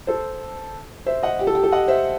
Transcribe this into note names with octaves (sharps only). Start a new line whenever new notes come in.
A4 C5
C5 E5
D#5 F#5
G4
A4
G4
A4
D#5 F#5
C5 E5